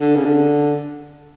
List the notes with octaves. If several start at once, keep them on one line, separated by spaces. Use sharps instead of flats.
D3
C#3
D3